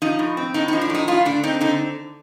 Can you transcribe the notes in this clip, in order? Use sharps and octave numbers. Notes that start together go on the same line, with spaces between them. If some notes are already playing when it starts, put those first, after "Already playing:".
F3 D#4
A2
C4
A2 D#4
D#4
F3
D4
A2 D#4
A3 F4
D3 D4
C4 D#4
D3 D#4